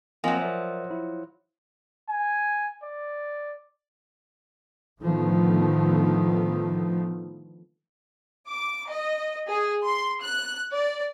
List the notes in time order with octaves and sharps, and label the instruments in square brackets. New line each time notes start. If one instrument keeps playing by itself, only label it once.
[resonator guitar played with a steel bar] F3 F#3 [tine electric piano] A#3 C4 D#5 [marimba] G#5
[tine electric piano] A#4 D5 E5
E4
[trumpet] G#5
D5
[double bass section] A2 D3 D#3 F3 A3 B3
[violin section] D6
D#5
G#4
C6
F#6
D5